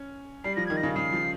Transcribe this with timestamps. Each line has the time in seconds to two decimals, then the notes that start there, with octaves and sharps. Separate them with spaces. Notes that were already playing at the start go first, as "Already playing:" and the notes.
Already playing: C#4
0.44 G3 C7
0.56 F3 A#6
0.66 D#3 G#6
0.77 A#6
0.83 C#3
0.95 C#3 C7
1.13 F3